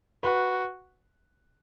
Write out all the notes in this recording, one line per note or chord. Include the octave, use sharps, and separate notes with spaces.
F#4 B4